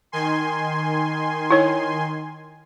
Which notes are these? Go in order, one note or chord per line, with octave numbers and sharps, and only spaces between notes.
D#3 G#5 C6
E4 C#5